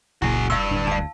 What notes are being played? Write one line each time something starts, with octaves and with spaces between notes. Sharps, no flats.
F1 C#2 A#2 E4 F#4 G#4
G2 F5 E6
D1 D4
D2 F5 A5